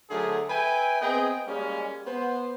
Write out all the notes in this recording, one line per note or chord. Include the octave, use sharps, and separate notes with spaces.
D3 F#3 A3 G#4 A#4
B4 E5 G5 G#5
B3 C4 G#4 D#5 G5
G3 G#3 A#3 C#4
B3 C5